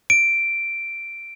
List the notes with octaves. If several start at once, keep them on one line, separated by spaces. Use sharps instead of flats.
D7